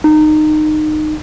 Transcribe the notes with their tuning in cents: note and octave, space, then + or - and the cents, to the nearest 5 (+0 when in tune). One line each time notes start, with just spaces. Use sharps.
D#4 -25